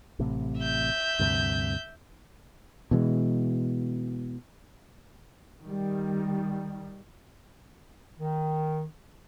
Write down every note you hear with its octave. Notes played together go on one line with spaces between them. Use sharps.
A1 A2 C3
E5 G6
D2 G2 C3
B2 E3 G#3
D#3 G3
D#3